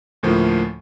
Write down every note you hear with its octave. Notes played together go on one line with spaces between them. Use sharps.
D2 A2 F3 A#3